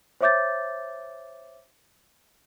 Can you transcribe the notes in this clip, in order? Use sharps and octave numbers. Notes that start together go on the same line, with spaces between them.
C5 C#5 E5 D6 G6 A6